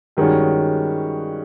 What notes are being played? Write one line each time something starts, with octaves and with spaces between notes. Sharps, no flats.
G2 D#3 G#3 C#4 F#4